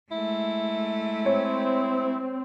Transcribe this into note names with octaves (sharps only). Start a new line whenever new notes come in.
G#3 A3 E4
C4 C#5